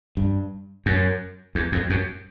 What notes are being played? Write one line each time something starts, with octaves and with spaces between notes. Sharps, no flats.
G2
F#2
E2
F2
F#2